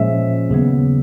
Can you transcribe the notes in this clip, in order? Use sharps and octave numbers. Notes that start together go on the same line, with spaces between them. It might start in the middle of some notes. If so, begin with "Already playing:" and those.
Already playing: A#2 F3 G#3 C#4 E5
D#2 C#3 F#3 B3